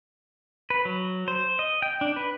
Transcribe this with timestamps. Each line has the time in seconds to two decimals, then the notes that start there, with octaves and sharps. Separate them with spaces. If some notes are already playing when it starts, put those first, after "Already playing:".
0.70 B4
0.85 F#3
1.28 C5
1.59 D#5
1.82 G5
2.01 D4
2.16 B4